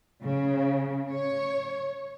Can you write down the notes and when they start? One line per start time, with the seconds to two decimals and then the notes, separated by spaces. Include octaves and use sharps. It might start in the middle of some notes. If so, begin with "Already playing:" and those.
0.22 C#3
1.10 C#5